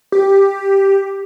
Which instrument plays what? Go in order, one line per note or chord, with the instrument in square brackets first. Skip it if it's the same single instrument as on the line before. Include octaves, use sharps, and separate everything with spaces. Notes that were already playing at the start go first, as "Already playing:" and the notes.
[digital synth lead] G4